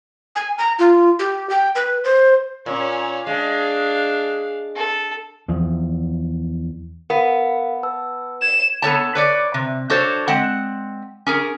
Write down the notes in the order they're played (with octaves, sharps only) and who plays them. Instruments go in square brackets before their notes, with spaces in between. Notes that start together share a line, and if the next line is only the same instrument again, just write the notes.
[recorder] G#5
A#5
F4
G4
G5
B4
C5
[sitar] A#2 [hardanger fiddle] C#4 C#5
[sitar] G#3 [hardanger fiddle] D4 F5
[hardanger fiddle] A4
[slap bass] E2 F3
[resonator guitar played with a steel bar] B3 [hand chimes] A#4 F5
[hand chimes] B4 A5 E6
[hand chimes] G#6 [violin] E7
[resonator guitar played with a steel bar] B3 A4 C#5 A5
B4 C#5 D5
C3
D4 F#4 A4 C5 C#5
G#3 C4 F#5
C#4 G#4 A#4